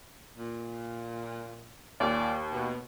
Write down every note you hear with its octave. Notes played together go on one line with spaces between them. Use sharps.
A#2
D#2 A#2 D5
B2